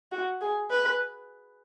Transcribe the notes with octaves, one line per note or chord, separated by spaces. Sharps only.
F#4
G#4
B4